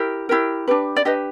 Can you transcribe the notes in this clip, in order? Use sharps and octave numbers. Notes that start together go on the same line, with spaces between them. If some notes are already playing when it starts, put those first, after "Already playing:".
Already playing: E4 G4 A#4
E4 G4 A#4
D4 G4 B4
D5
D4 G4 B4 D#5